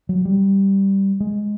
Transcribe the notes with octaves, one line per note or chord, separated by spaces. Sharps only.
F#3
G3
G#3